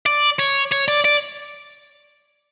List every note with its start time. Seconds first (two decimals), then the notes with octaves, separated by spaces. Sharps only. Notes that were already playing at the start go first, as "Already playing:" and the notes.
0.06 D5
0.39 C#5
0.72 C#5
0.88 D5
1.05 D5